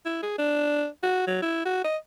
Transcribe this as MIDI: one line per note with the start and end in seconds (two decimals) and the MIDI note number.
0.06 0.21 64
0.23 0.37 68
0.38 0.87 62
1.03 1.24 66
1.27 1.42 54
1.42 1.62 64
1.65 1.82 66
1.84 1.97 75